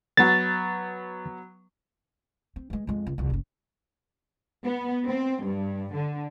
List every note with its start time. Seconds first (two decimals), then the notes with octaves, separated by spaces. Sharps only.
0.17 F#3 B3 A6
2.56 C4
2.70 E3 G#3
2.87 F2 G#3
3.07 C#2
3.18 C2 F2
3.30 F#1 C#4
4.64 B3
5.08 C4
5.45 G2
5.95 D3